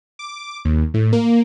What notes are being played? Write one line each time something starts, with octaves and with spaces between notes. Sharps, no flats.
D6
D#2
A2
A#3